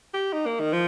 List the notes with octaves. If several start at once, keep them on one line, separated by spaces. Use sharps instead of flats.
G4
D#4
A#3
D#3
F3